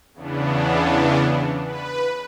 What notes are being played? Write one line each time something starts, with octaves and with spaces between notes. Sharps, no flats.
E2 C#3 E3 B3 D4
B4